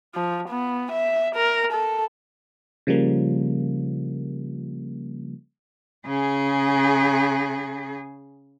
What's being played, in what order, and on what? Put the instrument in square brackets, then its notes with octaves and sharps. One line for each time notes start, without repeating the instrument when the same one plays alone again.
[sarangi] F3
B3
E5
A#4
A4
[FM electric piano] C#3 F3 G3 A#3
[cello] C#3 G#4